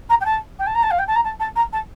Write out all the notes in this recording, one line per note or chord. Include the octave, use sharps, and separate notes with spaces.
A#5
G5
A5
G5
A5
A#5
A5
F5
G5
A5
A#5
A5
A5
A#5
A5